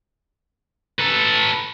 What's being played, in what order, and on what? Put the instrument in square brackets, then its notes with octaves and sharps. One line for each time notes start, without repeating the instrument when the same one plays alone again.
[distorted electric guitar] A4 B4